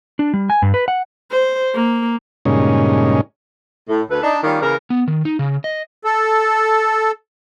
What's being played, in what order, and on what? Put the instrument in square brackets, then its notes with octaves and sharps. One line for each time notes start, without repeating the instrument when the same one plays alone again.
[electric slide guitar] D4
G3
G#5
G2
B4
F#5
[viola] C5
A#3
[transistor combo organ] G2 A#2 C#3 G#3 C#4 D#4
[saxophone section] A2
D2 A3 A4 B4
D4 D#4
D#3 G3 A#3 C#4 F4 D5
C#3 E3 A#3 A#4
[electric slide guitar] B3
D#3
D#4
C#3
D#5
[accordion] A4